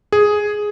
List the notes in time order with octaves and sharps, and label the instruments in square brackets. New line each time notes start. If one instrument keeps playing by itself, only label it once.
[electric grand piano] G#4